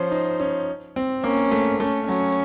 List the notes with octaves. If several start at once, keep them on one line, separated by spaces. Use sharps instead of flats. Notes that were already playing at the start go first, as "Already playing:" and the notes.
Already playing: F3 C#4 C5
D#4
C#4
C4
A#3 C#4
A3
A3 C#4
F#3 C#4